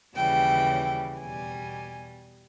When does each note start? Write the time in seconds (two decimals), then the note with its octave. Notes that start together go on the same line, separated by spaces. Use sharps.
0.16 D#2 C#3 E3 G3 G5
1.19 E2 B2 G3 G#5